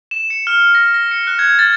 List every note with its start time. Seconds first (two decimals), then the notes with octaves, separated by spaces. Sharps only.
0.11 E7
0.30 C#7
0.47 F6
0.60 F6
0.75 A#6
0.94 A#6
1.11 C#7
1.27 F#6
1.39 G#6
1.59 A6